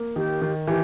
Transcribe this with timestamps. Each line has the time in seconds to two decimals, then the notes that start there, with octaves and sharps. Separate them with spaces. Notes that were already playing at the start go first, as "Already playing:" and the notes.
Already playing: A#3
0.16 D#3 G4
0.42 D#3
0.67 E3 G4